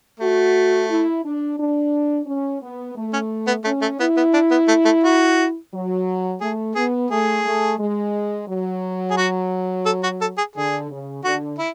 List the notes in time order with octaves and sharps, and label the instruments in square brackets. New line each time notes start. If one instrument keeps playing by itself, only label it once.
[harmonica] A3 [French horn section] F#4
[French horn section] E4
D4
D4
C#4
B3
A3
[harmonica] C#4
B3
[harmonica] A3 [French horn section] C#4
[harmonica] A3
[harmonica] B3 [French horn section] E4
[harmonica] B3
D4
B3
A3
A3
F#4
[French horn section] F#3
[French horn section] A3 [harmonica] G#4
[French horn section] B3 [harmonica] G#4
[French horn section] A3 [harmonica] G#4
[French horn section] A3
G#3
F#3
[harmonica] G#4
F#4
A4
F#4
A4
G#4
[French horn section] D3 [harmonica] G#4
[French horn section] C#3
[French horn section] D3 [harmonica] F#4
[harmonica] E4